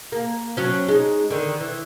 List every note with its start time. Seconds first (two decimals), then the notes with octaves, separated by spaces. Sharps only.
0.12 A#3
0.57 F#3 C#4
0.88 G#3 D#4
1.30 D3 D#3
1.60 E3